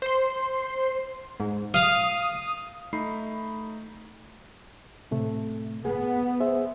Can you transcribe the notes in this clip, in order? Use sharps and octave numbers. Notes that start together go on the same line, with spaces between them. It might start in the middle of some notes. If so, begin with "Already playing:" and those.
C5 C6
G#2
F5 D#6
A3 D#4 B5 C7
A2 C3 A3
B3 G#4
G#4 C5 E5